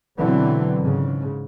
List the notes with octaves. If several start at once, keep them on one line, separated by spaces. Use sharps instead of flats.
B2 D3 E3 F#3 C4
G#2 C#3